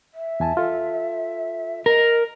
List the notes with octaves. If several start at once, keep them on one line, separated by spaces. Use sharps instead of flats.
E5
E2 G#5 A5
F4 A4
A#4 D#5